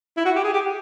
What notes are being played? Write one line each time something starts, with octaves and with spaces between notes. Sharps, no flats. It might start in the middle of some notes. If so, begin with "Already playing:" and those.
E4
F#4
G4
G#4
G4